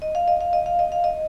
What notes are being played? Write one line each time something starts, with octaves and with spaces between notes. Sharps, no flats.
D#5
F5
D#5
F5
D#5
F5
D#5
F5
D#5